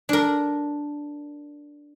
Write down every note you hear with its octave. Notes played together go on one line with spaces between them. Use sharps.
D4 A#4